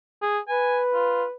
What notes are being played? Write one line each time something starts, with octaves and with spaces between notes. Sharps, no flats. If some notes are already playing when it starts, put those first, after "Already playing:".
G#4
B4 G#5
F4